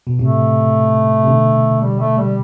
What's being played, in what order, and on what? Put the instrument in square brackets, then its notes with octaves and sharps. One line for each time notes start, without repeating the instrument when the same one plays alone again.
[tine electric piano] B2
[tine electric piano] A2 C3 [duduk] A3
[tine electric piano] C3
B2 D3
[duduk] G3
A3
G3